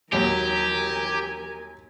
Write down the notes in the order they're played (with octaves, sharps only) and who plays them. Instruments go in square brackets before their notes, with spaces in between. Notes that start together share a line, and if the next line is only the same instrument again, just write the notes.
[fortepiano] D#2 F#3 [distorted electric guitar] G4 [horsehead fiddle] A#4 G#5